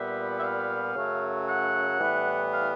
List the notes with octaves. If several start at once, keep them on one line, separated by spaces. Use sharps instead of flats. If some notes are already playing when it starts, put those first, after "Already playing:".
Already playing: A#2 G3 B3 E5
E5
F5
F#2 C#3 F#3 A3
F#5
A2 E3 G3 B3
F5